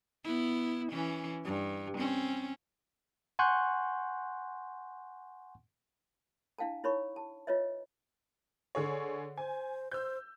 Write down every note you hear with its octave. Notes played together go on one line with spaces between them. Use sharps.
B3 E4
E3 C#4
G2
C4 C#4
F#5 G#5 C6 C#6 F#6 G6
D4 E4 F5 G5 A5
D#4 E4 C#5 B5 C#6
A5
F4 B4 C#5 D#5 E5
D3 G#4 C#5
C5 G#5
C5 E6 G6